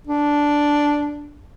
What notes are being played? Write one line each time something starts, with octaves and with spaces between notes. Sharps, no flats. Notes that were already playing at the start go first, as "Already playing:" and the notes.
D4